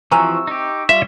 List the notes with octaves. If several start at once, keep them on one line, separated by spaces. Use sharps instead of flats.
C3 E3 F3 F#4 G#5 A#5 C#6 E6
D#4 G4
G3 F4 E5